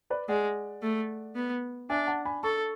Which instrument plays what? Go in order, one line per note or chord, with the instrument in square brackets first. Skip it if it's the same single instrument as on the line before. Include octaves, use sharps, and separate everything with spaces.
[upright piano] B4 D5
[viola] G#3 [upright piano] D5 F#5
[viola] A3
B3
[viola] D4 [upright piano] E5 G#5
[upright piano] F#5 A5
G#5 B5
[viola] A4 [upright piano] A5 C#6